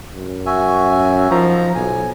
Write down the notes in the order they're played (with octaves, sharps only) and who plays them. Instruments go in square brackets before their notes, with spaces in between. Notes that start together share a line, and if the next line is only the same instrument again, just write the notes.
[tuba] F#2
[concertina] F#4 E5 G#5
[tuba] F3 [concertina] D#4 A#5
[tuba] B1 [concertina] G#5